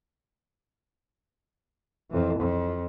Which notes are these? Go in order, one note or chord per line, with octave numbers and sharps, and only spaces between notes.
F2 E3
F2